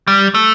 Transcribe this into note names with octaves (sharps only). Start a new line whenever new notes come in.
G3
A3